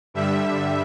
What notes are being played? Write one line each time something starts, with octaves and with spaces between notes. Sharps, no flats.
G2 D3 G3 E5